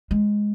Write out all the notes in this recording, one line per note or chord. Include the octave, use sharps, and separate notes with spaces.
G#3